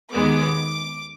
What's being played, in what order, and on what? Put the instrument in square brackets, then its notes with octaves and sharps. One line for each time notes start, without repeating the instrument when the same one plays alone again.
[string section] D#2 D#3 G#3 B3 D6